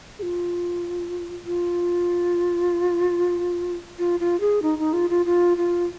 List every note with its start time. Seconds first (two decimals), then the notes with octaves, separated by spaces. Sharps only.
0.19 G#4
0.22 F4
1.46 F4
3.99 F4
4.20 F4
4.40 G#4
4.62 D#4
4.79 D#4
4.93 F4
5.10 F4
5.26 F4
5.57 F4